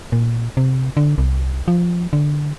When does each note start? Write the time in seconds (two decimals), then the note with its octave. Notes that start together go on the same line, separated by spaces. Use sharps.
0.12 A#2
0.57 C3
0.97 D3
1.18 C2
1.68 F3
2.13 D3